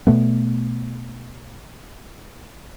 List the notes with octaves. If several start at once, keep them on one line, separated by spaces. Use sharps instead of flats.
B2 A3 B3